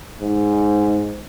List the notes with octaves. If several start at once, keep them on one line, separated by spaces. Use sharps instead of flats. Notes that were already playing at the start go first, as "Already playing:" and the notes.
G#2